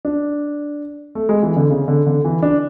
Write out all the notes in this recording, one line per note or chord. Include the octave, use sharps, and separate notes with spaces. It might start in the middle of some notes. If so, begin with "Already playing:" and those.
D4
A3
G#3
E3
D3
C#3
D3
D3
E3
D4